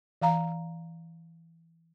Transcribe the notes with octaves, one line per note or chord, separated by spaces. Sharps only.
E3 F5 A#5